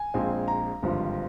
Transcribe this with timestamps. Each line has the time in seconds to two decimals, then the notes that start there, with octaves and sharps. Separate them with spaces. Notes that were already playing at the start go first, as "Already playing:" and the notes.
Already playing: G#5
0.14 A#1 A#2 G#3 C4
0.48 A#5
0.83 G#1 G2 D3 F3